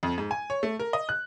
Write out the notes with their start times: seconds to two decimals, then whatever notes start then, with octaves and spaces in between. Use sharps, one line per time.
0.03 F2
0.18 G#2
0.31 G#5
0.50 C#5
0.63 A3
0.79 A#4
0.93 D#5
1.09 F#6